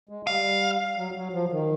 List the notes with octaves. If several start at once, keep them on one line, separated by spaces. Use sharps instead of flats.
G#3
G3 F5
F#3
F#3
F3
D#3